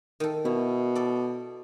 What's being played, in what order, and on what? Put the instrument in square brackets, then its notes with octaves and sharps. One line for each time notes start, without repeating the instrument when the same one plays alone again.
[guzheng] D#3 A4
[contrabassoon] B2 [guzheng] E4
[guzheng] A4 D5